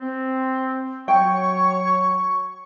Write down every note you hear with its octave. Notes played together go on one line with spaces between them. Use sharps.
C4
F#3 C#5 G5 C#6